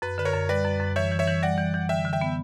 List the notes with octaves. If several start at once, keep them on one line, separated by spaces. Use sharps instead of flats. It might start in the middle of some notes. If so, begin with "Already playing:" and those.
F#2 B4
D3 B4
A#4 C#5
F#2
G3 B4 D5
F#2
F#2
E3 C#5 E5
E3
C#5 E5
E3
G3 D5 F#5
E3
E3
D3 E5 G5
D3
E5 G5
B3